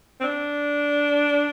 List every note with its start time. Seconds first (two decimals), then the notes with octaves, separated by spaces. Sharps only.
0.21 C4
0.24 D4